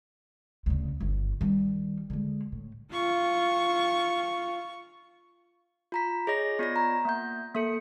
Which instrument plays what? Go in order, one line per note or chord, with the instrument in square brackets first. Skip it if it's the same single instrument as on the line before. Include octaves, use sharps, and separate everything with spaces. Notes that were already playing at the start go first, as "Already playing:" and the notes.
[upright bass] D2 C#3
G1
D#3 G3
D3 G#3
A2
[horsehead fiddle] F4 [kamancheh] C#6
[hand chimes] F4 A#5 B6
G#4 C#5 D#5 A#6
B3 F4 D5 A#6
A#5
A#3 F#5 G6
A#3 A4 C#7